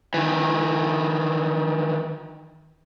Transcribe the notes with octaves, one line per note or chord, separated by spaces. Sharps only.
D#3 E3